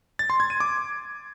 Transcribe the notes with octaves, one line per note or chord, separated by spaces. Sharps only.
A6
C6
G#6
D#7
D6